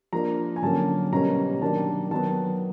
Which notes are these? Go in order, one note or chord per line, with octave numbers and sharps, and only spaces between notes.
F3 A#3 D4 A#5
G#5
D3 F#3 A#3 C#4 A5
B2 G3 A#3 C#4 A#5
D#3 F#3 A#3 D4 A5
D#3 F#3 B3 A5